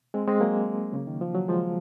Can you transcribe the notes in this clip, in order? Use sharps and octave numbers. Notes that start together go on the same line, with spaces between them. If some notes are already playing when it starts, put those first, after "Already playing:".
G#3 C4
G#3 C4
F#3 A#3
C#3
D#3
F3
F#3
F3 G#3